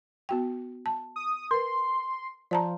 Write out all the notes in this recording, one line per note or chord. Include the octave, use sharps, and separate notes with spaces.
B3 F#4 G5
A5
D#6
A#4 B4 C6
F3 D5 A5 A#5